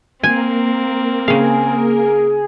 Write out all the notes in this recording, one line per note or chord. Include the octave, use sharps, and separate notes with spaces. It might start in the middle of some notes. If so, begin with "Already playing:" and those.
A#3 C4 A#4 G#5
C#3 G#4 F5